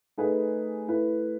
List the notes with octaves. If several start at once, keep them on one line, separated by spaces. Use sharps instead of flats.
A3 D#4 G#4 B4
A3 E4 B4